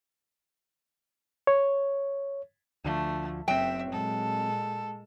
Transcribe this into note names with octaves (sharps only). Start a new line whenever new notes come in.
C#5
D2 D3 F3 A3
F#1 F#3 C4 E5 G5
A#2 G#3 A4